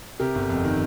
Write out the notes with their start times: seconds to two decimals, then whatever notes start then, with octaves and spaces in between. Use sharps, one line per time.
0.20 C3 G4 A#4
0.35 G1
0.50 F2
0.65 D#3